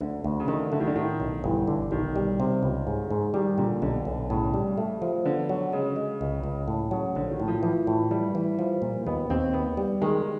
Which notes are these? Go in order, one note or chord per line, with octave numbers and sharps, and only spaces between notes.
D2 D3
D2
C#3
D3 D#3
D3 A3
D#3
D3
A2 D#3
B1
G1 E3
D3
B1 D#3
G3
C3
C#2
G#2
G#2
D#3 G3
A#2 D3
B1 D3
B1
A2 C#3
G3
A3
F3
D3 B3
F#3
C#3 G#3
G#3
C#2
C#2
A2
C#3 F#3
A#1 D3
D#3
A2
F3
E3 F3
A2
E3 G3
E3
F3
A#2
D#2 B3
D#2 C4
D#3 B3
G3
D#3 G#3